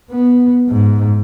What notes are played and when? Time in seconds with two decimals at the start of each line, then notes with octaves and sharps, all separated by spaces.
0.11 B3
0.70 G#2